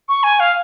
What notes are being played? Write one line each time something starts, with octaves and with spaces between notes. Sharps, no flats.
C#6
G#5
F5